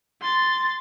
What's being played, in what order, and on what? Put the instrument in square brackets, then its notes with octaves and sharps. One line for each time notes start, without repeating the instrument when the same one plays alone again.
[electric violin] C6 A6